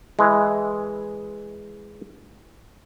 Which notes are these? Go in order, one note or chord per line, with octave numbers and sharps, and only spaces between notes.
E3 G#3